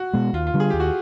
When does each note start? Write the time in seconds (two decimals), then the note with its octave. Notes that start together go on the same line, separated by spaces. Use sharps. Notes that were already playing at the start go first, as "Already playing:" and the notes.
Already playing: F#4
0.13 B2 G#3
0.33 D#2 F4
0.47 F4
0.54 D3 G3
0.60 G#4
0.70 D#2 G4
0.80 F#4